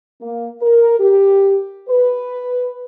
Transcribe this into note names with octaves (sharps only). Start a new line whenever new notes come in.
A#3
A#4
G4
B4